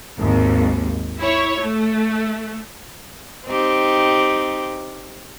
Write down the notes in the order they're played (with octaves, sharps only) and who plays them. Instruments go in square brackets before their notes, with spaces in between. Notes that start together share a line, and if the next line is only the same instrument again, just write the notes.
[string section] G#1 D#2
E4 C#5
A3
[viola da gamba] C4 D#4 G4